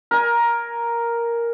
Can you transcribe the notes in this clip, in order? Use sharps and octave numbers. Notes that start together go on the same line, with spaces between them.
A#4 G#5